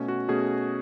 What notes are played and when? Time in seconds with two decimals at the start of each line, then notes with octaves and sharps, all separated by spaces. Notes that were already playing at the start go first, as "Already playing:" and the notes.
Already playing: B2 A3 C#4
0.08 F#4
0.28 B2 A3 C#4 G#4